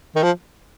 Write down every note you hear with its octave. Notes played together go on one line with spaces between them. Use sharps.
D#3
F3